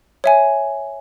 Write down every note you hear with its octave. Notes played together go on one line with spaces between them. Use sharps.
C#5 E5 G#5